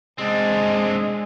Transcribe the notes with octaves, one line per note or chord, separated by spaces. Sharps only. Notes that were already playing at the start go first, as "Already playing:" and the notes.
G#3 C4 D4